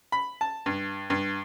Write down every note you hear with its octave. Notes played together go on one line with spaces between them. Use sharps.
B5
A5
G2
G2